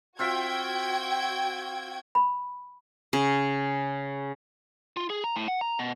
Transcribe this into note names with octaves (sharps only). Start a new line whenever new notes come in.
C4 F4 F#4 E5 G5 G#6
B5
C#3
F4
G#4
A#5
A2
F#5
A#5
B2